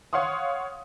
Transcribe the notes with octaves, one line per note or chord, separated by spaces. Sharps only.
C#5 F5 F#5 C6 D#6